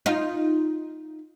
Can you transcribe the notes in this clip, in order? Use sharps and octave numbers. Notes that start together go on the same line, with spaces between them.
D#4 F4